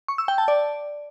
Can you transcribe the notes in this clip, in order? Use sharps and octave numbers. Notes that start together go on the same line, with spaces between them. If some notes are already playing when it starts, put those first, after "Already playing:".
C#6
E6
G5
A5
D5